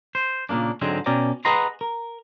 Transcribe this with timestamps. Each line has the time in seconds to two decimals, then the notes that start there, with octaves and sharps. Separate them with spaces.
0.15 C5
0.49 A#2 C#3 A#3 D4
0.81 G#2 D3 F#3 G#3 C4
1.06 B2 C#4 D5 G5 A#5
1.45 G#4 B4 D#5 F#5 A#5 C6
1.81 A#4